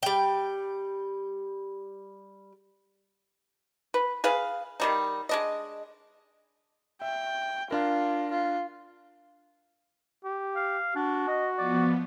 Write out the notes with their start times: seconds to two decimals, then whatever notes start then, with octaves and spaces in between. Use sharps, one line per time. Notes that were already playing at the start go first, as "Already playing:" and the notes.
0.03 G3 G5
3.94 B4
4.24 G#4 B4 F5
4.80 D#3 G3 D#4
5.29 G#3 D4 D#5
7.02 E5 G5
7.71 D4 F4 A#4
8.31 F4
10.25 G4
10.56 F5
10.95 D4 F#4
11.28 D#5
11.58 F3 B3 D5